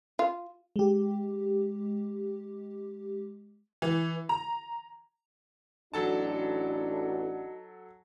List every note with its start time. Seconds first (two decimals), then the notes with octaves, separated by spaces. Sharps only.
0.19 F4
0.76 G#3 G4
3.82 E3
4.29 A#5
5.94 A1 F#3 D4 D#4 F#4 A4 A5